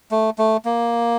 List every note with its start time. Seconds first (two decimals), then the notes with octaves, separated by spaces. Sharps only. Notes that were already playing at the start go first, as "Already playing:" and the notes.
0.11 A3
0.38 A3
0.65 A#3